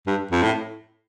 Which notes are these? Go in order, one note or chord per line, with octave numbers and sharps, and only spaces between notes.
G2
F2
A2